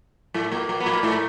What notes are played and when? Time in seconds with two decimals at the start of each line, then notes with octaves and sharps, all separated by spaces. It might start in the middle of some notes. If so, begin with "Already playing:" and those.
0.34 A2 A3
0.52 A#2 A#3
0.69 A#2 A#3
0.80 B3
0.86 A#2 A#3
1.03 A2 A3